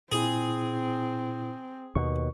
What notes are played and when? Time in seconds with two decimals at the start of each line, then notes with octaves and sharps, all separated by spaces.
0.12 A#2 C4 E4 G#4
1.95 D#2 B2 C#6